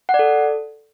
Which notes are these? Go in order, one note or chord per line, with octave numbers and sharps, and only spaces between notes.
F#5
D5
A4